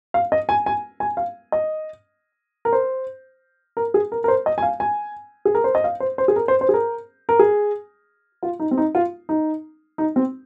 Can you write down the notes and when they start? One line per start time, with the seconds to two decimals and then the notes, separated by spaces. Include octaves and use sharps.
0.14 F5
0.32 D#5
0.49 G#5
0.66 G#5
1.00 G#5
1.17 F5
1.52 D#5
2.65 A#4
2.73 C5
3.77 A#4
3.94 G#4
4.12 A#4
4.24 A#4
4.28 C5
4.46 D#5
4.58 G#5
4.63 F5
4.80 G#5
5.45 G#4
5.55 A#4
5.64 C5
5.75 D#5
5.84 F5
6.00 C5
6.18 C5
6.28 G#4
6.36 A#4
6.48 C5
6.61 C5
6.69 G#4
6.74 A#4
7.29 A#4
7.39 G#4
8.43 F4
8.60 D#4
8.71 C4
8.78 D#4
8.95 F4
9.29 D#4
9.98 D#4
10.16 C4